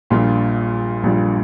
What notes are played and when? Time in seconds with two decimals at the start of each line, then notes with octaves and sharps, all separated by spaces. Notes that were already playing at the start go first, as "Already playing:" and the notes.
0.10 A#1 A#2 G3 D4 F4
1.04 A#1 A#2 G3 D4 F4